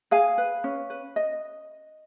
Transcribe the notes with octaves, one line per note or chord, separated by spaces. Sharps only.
G#4 F5 G#5
B4
C#4
B4
D#5